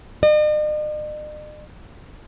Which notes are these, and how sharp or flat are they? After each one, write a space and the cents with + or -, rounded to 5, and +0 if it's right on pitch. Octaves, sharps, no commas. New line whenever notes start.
D#5 -45